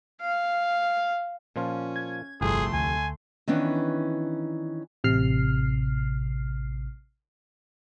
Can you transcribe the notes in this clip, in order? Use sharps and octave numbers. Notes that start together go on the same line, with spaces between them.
F5
A#2 F3 C#4 F4
G#6
G1 C2 F2 A3 G#4 C6
D2 G#5
D#3 E3 B3 C#4 D4
A1 C3 F6 C7